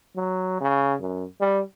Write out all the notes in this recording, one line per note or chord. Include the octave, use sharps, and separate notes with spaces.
F#3
C#3
F#2
G3